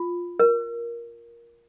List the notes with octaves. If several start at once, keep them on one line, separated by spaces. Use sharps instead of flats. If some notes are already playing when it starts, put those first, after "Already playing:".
Already playing: F4
A#4